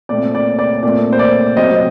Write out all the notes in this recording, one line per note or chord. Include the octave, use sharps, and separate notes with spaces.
A#2 A3 C4 D5
D5
D5
A#2 A3 C4 D5
C5
D5
C3 F#3 C4 C5 D#5